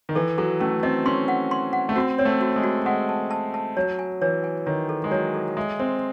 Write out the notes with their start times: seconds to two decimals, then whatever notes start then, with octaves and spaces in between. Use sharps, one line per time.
0.09 D#3
0.15 E3 A4
0.38 F#3 A4
0.60 A3 C#4
0.83 C4 D#5
1.06 C#4 C6
1.28 F#5
1.51 C6
1.73 F#5
1.89 A3
1.96 C4 F#4
2.18 C4 C#5
2.25 A3
2.41 F#4
2.56 G#3
2.64 F#4
2.86 G#3 F#5
3.09 A5
3.31 A5
3.54 A5
3.77 F#3 C#5
3.99 G#5
4.21 E3 C#5
4.44 G#5
4.66 D#3 C#5
4.89 A4
5.04 G#3
5.11 F#3 C#5
5.34 A4
5.57 G#3 E5
5.79 C4 C5